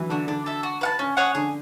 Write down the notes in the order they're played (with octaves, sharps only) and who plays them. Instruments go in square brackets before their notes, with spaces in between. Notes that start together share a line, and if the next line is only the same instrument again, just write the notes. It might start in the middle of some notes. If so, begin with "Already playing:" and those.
Already playing: [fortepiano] E3 F#3
[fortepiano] D3 [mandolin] D4 F#4
[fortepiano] D3 [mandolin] D4
[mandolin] A4 E5
F#4
B4 F#5 A5
[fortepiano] C#3 [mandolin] C#4
[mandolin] G#4 C#5 F#5
[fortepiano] D3 [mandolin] G#4